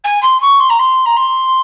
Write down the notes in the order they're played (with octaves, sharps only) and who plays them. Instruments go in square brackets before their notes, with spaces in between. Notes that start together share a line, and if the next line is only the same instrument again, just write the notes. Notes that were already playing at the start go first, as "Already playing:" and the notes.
[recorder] G#5
C6
C#6
C6
A#5
C6
A#5
C6